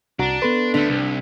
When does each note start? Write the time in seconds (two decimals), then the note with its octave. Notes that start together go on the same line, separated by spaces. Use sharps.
0.19 C2 D4 F#4 A#5
0.42 B3 A4 B4 C6
0.74 D3 A3 D4 B6
0.89 C2